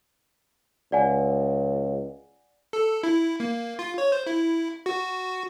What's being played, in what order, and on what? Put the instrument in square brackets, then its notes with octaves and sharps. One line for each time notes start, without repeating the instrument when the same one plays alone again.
[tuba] C#2 [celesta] D5 F#5 G#5
[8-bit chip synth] A4
E4
A#3
F4
C#5
C5
E4
F#4